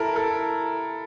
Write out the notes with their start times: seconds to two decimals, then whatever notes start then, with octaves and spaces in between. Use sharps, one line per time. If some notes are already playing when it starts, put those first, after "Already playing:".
Already playing: E4 A4 A#4
0.16 A4